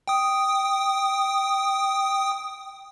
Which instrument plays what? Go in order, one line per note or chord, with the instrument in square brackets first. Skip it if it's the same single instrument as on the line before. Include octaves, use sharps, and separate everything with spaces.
[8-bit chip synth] G5 D#6